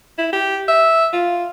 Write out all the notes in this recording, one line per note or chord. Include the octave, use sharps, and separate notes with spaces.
E4
G4
E5
F4